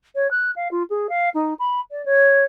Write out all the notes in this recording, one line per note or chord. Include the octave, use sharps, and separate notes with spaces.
C#5
F#6
F5
F4
G#4
F5
D#4
B5
D5
C#5